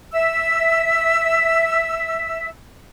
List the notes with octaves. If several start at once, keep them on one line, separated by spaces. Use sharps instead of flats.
E5 E6